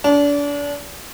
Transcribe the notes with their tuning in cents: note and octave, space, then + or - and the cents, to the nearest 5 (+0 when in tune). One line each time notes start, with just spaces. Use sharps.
D4 -35